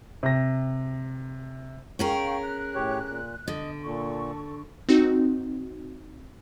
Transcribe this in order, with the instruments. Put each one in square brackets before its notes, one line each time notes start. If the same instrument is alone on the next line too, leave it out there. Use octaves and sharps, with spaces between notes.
[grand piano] C3 A#6
[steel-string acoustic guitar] C#4 G#4 A#4 [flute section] F5 G5 C#6
[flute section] F#6
[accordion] A2 G4 C#5
A#2
[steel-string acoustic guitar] D3 [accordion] D#5
[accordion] A#2 [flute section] A4 C#6
[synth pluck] C4 D#4 F#4